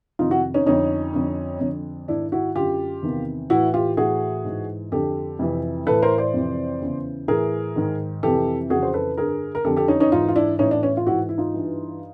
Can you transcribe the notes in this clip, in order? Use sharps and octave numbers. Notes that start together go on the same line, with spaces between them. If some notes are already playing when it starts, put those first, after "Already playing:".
F2 C3 D#3 D#4 F4
E4 F#4
C#4 D#4
F2 D3 C#4 D#4
F2 D3
F2 D3
G#2 D#3 D4 E4
E4 F#4
F#2 D3 F4 G4
E2 C3 D#3
A2 E3 E4 F#4
F4 G4
A2 E3 F#4 G#4
G#2 E3
F2 D3 G4 A4
F2 C3 E3
A2 E3 A4 B4
A#4 C5
C5 D5
F2 C3 E3
E2 C#3 E3
A2 E3 G#4 A#4
G#2 D#3
F2 C3 E3 G4 A4
F2 C#3 E3 F#4 G#4
C5
A4 B4
G2 D3 G#4 A#4
A#4
F2 D3 G4 A4
G4 A4
C#4 D#4
C#4 D#4
G#2 E3 D#4 F4
F4
D4 E4
A2 E3 C#4 D#4
D4
C#4
F4
G#2 E3 E4 F#4
E4
D#4 F4
G2 E3